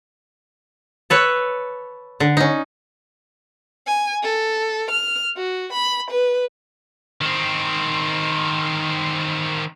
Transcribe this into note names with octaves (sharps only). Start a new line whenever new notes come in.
A4 B4 C#5
D3
C#4 D#4
G#5
A4
F6
F#4
B5
B4
D#3 C4